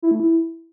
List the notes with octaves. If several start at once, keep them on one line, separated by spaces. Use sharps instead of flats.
E4
A3
E4